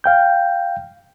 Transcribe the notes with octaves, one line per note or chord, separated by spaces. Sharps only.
F5 G5 G6